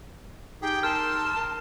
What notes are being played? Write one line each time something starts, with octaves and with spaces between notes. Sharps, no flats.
D#4 G4 G#4 G5
A#4 A5 C6 E6 F6